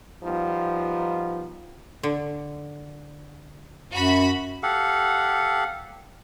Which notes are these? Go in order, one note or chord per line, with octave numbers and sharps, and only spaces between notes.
F3 G3 B3 D#4 F4
D3
F#2 F#4 B5
G4 A4 F5 F#5